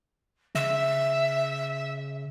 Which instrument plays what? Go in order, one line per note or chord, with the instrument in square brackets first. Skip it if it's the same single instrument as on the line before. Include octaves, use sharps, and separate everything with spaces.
[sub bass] C#3 [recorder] E5